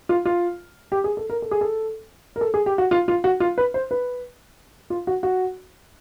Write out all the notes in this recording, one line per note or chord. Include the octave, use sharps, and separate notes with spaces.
F4
F4
G4
G#4
A4
A#4
A4
G#4
A4
A#4
A4
G#4
G4
F#4
F4
F4
F#4
F4
B4
C5
B4
F4
F#4
F#4